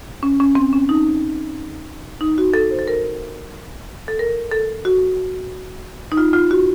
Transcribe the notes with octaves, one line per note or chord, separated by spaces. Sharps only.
C#4
C#4
C4
C#4
D#4
D#4
F#4
A4
C5
A4
A#4
A4
A#4
A4
F#4
D#4
F4
F4
F#4